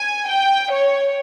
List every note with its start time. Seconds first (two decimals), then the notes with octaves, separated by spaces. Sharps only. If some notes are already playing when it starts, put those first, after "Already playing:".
Already playing: G#5
0.27 G5
0.71 C#5